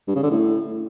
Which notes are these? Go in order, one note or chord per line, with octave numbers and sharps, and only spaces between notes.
G2
C#3
D3
A2